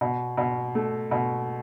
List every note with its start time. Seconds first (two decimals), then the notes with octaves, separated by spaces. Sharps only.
0.01 B2
0.37 B2
0.75 A3
1.11 B2